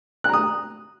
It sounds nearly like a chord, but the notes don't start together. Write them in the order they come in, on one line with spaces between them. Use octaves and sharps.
F#6 A#5 D#6